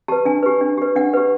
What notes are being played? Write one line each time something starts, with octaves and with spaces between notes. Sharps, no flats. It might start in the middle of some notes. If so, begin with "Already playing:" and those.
G4 B4 A5
D4 G#5
G4 B4
D4
G4 B4
D4 F#5
G4 B4